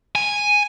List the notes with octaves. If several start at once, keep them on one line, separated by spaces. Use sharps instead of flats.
G#5